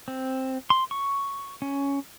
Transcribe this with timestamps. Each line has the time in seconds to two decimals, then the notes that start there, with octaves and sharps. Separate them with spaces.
0.08 C4
0.70 C6
0.91 C#6
1.62 C#4